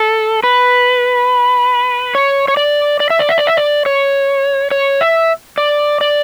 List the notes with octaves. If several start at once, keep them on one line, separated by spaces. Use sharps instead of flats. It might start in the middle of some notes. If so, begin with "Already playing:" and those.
Already playing: A4
B4
C#5
C#5
D5
D5
E5
D5
E5
D5
E5
D5
C#5
C#5
E5
D5
D5